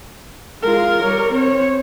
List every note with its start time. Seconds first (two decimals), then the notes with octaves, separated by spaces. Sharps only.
0.63 G#3 F4 A#4
1.03 G3 C#5
1.32 C4 C#5